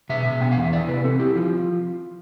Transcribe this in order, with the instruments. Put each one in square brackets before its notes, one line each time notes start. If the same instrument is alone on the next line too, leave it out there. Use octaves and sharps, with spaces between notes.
[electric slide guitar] B2 E5
B2
B3 G5
F5
E2
E5
E4 D5
C3 B4
C4 A4
E4 G4
F3 F4